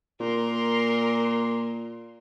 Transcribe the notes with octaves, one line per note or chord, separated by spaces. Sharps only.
A#2 A#4 C6